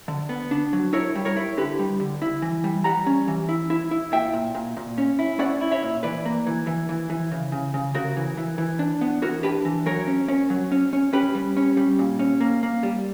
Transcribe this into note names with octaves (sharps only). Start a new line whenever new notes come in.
D3
B3
D4
F#3
E4 A#4 C#5
G3
A#4 C#5
E4
D3 G4 B4
G3
D3
E4
E3
G3
G3 F#5 A#5
C#4
E3
E4
E4
E4
A#2 E5 G5
A#2
A#2
A#2
C#4
E4
C#4 D5 F#5
E4
C#5 E5
A#2
E3 B4 D5
A#3
E3
E3
E3
E3
C#3
C#3
C#3
C#3 F#4 A#4
E3
E3
E3
D4
B3
E3 F#4 A#4
D4 G4 B4
E3
F#3 A#4 C#5
C#4
C#4
F#3
C#4
C#4
C#4 G4 B4
G3
C#4
G3
A#2
C#4
A#3
A#3
G3